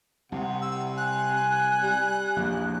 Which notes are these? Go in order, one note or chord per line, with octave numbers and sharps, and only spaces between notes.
C2 C3 F#5
E6
G#5 F#6
G3
A#1 E2